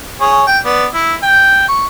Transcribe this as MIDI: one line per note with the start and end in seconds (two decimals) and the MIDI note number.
0.21 0.42 68
0.21 0.42 73
0.47 0.58 79
0.65 0.86 59
0.65 0.86 74
0.94 1.15 64
1.23 1.68 79
1.69 1.86 85